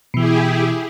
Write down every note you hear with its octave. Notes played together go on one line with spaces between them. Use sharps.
B2 E3 E4 G4 G#4